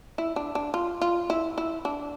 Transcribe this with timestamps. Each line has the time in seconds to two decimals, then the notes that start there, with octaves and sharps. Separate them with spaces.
0.18 E4
0.36 D4
0.55 D4
0.74 F4
1.01 F4
1.30 E4
1.58 E4
1.85 D4